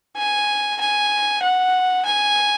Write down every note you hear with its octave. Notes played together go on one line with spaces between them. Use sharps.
G#5
G#5
F#5
G#5